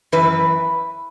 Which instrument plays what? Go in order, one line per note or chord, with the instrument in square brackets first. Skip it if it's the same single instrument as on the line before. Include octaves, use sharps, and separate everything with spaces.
[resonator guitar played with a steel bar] F#2 E3 B4